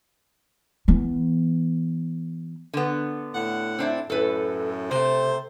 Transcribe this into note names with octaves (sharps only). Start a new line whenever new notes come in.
E3 B3
D3 B3
A2 F#5
C4 D4 E4
F#2 A2 A4 B4
C3 A3 C5